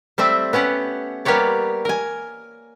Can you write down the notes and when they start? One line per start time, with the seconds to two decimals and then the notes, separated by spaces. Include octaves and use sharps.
0.18 G3 A3 C4 E5
0.53 B3 C#4 G4 F#5
1.25 G3 A#3 B3 G4 C#5 D5
1.85 A#4 G#5